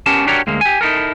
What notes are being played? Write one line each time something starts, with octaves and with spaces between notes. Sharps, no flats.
B3 C#4 G4 A#4 A5
D4 F#4 G4 A#4 C#5 D5
D2 G#3 A#3
G4 G#5
D#4 E4 A4 A#4